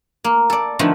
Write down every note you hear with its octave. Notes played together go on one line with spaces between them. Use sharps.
A#3
A4 D5
D3 D#3 F3 A3 B3